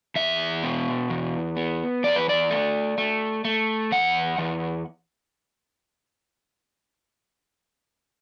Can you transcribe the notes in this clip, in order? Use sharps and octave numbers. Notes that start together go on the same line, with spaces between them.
E2 E5
B2
E2
B3
E2 D5
B4
D5
A3
A3
A3
E2 F#5
E2